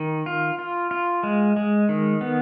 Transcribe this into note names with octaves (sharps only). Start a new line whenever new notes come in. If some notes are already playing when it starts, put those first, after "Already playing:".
Already playing: D#3
F4
F4
F4
G#3
G#3
D#3
B3